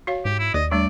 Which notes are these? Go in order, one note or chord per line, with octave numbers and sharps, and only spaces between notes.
F#4 C#5 F5
G#2 G4
E4
D#2 D5 D#5
G3 A3 D4 D5